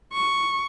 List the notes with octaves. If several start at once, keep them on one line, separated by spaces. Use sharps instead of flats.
C#6